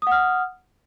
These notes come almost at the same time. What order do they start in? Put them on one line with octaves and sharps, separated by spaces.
D#6 F#5 F6